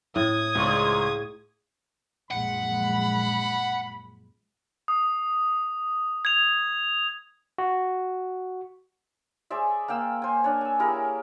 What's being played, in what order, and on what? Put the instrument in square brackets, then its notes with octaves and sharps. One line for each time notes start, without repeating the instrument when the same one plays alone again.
[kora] A2 [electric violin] D#6 G#6
[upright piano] C#2 D5 C#6 [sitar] G#2
[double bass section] A#1 F#2 G#3 [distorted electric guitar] F#5 [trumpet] B5
[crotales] D#6
G#6 F7
[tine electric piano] F#4
[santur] G#4 C5 D5 E5
A#3 F5 G5 E6
C5 G#5
D4 C#5
G#5 E6
E4 G4 G#4 A#4